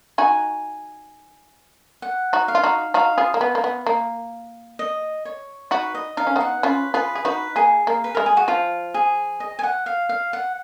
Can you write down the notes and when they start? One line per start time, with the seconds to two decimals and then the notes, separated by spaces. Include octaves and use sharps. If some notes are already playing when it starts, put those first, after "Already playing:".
0.18 D#4 F#4 G#5
2.02 F#5
2.33 D#4 F#4
2.48 F5
2.55 F4
2.64 D#4 F#4
2.94 D#4 F#4 F5
3.18 F4 G#4
3.34 A#3
3.41 B3
3.55 A#3
3.64 B3
3.87 A#3
4.79 D#5
5.25 C#5
5.71 D#4 F#4 B4
5.95 D#5
6.17 D#4 F5
6.27 C#4
6.36 B3 D#4 F#5
6.63 C#4 F4 B4
6.94 F4 G#4 B4
7.15 G#4
7.25 D#4 F#4 B4
7.56 A#3 G#4
7.87 A#3
8.04 B4
8.15 G#3 A#4
8.26 G#4
8.37 F#4
8.48 F3 F4
8.94 G#4
9.40 D#5
9.59 G#5
9.63 F#5
9.86 F5
10.09 F5
10.33 F#5